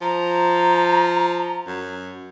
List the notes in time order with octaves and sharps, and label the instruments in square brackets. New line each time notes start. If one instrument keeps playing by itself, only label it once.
[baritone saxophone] F3 [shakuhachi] A#5
[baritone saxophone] F#2